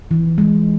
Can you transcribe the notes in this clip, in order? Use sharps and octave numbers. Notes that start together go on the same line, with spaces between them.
E3
G#3